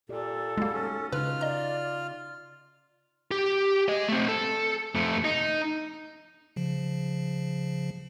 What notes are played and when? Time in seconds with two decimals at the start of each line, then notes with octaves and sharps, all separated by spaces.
0.09 A#2 G4 A4 D5
0.57 G3 G#3 A#3 D#4 F#4 G#4
0.73 C#4
1.13 C#3 D#4 F4 B4 F6
1.41 D5 D#5 A#5
3.31 G4
3.88 G#4 D#5
4.09 A3 C4
4.28 A4
4.95 F2 A3
5.24 D#4
6.56 C#3 F3